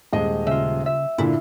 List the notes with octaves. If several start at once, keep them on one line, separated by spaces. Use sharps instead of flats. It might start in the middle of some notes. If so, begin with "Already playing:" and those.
D#1 G#3 D#5
C#3 F4 E5
E5
A#2 D3 E4